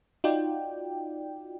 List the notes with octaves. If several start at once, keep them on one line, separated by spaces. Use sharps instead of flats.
D#4 F4 F#4 D5 G5